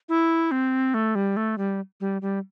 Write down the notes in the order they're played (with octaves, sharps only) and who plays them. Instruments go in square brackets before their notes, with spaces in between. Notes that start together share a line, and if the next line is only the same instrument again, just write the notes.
[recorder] E4
C4
A3
G3
A3
G3
G3
G3